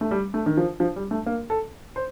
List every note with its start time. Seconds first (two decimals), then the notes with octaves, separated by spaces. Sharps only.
0.01 A3
0.11 G3
0.34 A3
0.46 D#3
0.57 F3
0.80 F3
0.96 G3
1.11 A3
1.26 A#3
1.50 A4
1.96 C5